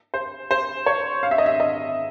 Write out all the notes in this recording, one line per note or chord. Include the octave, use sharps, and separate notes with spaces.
C5
C5
C#5
F5
E5
D#5
E5
D#5